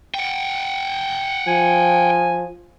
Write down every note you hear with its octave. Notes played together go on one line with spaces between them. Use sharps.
F#5 G5
F3 G#5